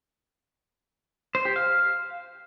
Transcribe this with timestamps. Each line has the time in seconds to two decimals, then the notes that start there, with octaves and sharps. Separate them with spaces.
1.35 C5
1.45 G4
1.56 F5